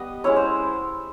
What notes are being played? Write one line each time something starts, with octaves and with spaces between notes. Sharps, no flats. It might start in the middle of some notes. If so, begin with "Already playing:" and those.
Already playing: G3 B3 D#5
G#3 C#4 E4 C#5
C5